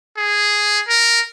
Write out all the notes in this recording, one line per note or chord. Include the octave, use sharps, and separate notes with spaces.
G#4
A#4